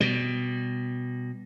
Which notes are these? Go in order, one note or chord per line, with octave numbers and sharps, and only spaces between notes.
B2 G3